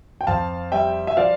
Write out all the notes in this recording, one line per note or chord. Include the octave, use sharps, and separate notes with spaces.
G5
F2 F5 A5
G3 E5 G5
E5
F3 D5 F5